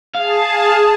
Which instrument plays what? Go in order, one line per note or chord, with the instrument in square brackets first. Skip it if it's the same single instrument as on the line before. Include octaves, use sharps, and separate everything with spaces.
[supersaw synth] G#4 A5 [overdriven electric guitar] F5